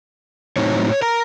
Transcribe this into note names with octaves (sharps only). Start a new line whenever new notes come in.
A2 F#3 C4 D#4 C#5
A#4 A#5